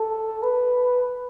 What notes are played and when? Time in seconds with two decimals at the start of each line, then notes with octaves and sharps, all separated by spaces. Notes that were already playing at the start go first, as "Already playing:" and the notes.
Already playing: A4
0.43 B4